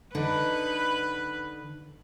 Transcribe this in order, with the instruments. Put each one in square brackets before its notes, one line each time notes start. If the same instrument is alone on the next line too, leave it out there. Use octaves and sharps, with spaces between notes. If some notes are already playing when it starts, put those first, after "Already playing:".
[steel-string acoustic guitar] D3 D#4 [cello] B4